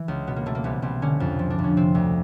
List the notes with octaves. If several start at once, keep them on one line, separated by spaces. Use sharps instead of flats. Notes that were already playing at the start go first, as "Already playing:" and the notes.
Already playing: E3
C#2
B2 B3
A#3
B2 A3
A#3
C2 B3
C2 C4
D3 C#4
F2
F3
D4
F2
C#4
C3 C4
D2